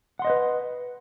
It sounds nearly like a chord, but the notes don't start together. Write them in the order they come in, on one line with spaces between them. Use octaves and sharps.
F#5 C6 D#5 C5 B4